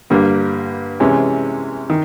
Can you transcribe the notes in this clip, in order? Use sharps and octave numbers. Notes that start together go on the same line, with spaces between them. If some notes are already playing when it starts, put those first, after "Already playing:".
G2 D3 G3 A#3
C3 E3 G#3 C#4
D#3